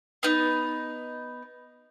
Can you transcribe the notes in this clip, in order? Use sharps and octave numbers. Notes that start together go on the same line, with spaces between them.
B3 D#4